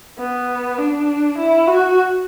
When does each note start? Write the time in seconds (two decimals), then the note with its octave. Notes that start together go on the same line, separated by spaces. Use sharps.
0.19 B3
0.78 D4
1.38 E4
1.68 F#4